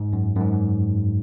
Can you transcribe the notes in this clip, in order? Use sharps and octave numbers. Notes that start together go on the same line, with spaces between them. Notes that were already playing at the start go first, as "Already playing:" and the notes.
Already playing: G#2
F#2
F#2
G#2